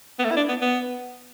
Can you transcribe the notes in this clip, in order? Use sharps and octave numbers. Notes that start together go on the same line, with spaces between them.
B3
A3
E4
D4
B3
B3